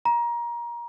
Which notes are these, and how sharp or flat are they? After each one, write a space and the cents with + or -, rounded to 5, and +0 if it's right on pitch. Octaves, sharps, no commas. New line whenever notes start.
A#5 +25